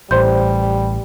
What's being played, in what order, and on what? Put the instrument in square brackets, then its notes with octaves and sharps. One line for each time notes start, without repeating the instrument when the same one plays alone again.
[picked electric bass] A1 [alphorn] G3 [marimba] C5 C6 G6